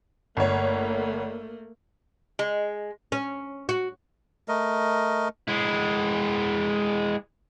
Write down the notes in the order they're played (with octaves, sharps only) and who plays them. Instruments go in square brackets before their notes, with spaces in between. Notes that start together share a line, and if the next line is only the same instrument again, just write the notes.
[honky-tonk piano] G1 C#5 [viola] A3 A#3
[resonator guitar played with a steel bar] G#3
[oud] C#4
F#4
[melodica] A3 A#4 D#5
[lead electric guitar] G#3 E4